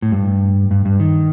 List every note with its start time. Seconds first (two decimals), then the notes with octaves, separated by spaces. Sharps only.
0.02 A2
0.12 G2
0.71 G2
0.85 G2
1.00 D#3